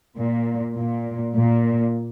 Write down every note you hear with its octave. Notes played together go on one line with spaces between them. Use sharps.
A#2
A#2
A#2